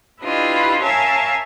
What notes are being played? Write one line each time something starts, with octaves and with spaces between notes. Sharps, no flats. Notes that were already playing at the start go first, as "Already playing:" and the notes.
D4 E4 F4 G4 B4 D#5
A#4 C#5 E5 F5 G#5 A5